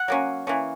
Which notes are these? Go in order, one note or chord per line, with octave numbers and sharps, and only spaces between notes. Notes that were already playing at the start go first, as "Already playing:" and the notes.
Already playing: F#5
F#3 A#3 C#4
E3 A#3 C#4